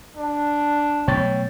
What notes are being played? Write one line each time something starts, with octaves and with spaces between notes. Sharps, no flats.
D4
B2 F#3 A3 C#5 G5 A6